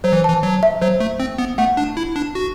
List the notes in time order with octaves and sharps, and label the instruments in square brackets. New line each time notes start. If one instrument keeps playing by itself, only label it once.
[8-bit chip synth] F#3 [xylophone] C5
[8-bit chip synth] E3
[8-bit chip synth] E3 [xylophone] A5
[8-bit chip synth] F#3
[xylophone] E5
[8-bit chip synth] F#3 [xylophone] C5
[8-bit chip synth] A3
C4
B3
[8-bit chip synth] A3 [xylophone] F#5
[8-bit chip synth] D4
E4
D4
F#4